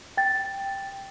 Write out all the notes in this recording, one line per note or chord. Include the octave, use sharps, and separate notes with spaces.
G5 A6